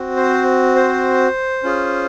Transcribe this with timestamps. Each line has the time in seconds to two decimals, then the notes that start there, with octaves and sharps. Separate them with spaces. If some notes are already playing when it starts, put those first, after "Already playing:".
Already playing: C4 F#4
0.17 C5
0.76 C5
1.63 C#4 F4 G#4